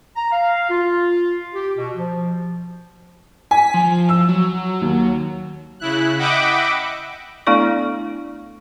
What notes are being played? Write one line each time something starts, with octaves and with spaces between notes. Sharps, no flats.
A#5
F5
F4
G4
B2
F3
G#5 B6
F3
E6
F#3
D#2
C#3 E4 F#6
D#5 E5 F#5 G5 B5 D6
A3 B3 D4 E4 A4 D5